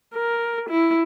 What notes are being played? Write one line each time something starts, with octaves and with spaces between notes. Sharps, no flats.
A#4
E4